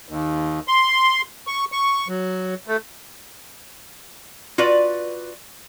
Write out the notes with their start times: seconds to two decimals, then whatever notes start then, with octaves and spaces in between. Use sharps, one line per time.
0.08 D#2
0.68 C6
1.47 C#6
1.72 C#6
2.08 F#3
2.67 A3
4.58 F4 F#4 B4 D5